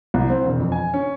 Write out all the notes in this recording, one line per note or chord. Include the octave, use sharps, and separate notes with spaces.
C2
C4
E1
F2
G#5
C#4